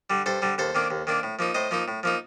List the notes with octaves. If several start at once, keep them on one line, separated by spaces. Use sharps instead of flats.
D3 G3
G2 A4 C5
D3 G3
D#2 A4 C5
D#3 A#3 D4
D#2
D#3 A#3 D4
A2
F3 A#3 D#4
A2 C5 D#5
F3 A#3 D#4
A2
F3 A#3 D#4